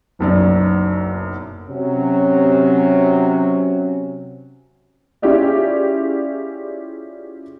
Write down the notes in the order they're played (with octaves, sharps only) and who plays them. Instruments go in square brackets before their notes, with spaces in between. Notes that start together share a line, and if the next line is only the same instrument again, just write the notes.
[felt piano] F#1 B1 F#2 D5
[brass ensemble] C3 F#3 C#4
[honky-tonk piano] C#4 E4 F4 G4 G#4 D5